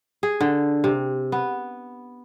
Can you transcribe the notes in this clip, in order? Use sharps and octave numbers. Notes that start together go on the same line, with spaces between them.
G#4
D3
C3
B3